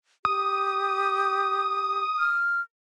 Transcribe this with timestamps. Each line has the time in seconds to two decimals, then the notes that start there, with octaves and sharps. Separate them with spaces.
0.25 G4 D#6
2.19 F6